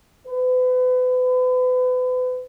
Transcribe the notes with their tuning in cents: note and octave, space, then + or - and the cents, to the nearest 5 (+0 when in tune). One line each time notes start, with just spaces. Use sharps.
B4 +35